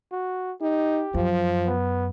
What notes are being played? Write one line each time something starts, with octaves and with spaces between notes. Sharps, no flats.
F#4
D#4 G4
F#2 F3
B3